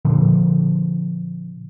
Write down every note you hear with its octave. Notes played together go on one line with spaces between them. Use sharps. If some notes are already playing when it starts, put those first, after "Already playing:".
A#2 D3 F3